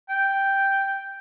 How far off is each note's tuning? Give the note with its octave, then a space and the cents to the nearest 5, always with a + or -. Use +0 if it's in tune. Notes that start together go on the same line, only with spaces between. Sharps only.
G5 +0